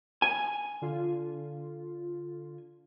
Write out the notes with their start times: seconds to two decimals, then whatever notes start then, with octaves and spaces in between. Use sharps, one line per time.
0.22 G#5
0.82 D3 F4